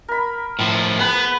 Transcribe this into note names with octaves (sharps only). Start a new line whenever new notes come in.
A#4 B5
A2 F3
B3 G#4 B4